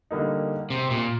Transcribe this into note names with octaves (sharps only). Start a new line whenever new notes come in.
D3 G3 A#3 D#4
C3
A#2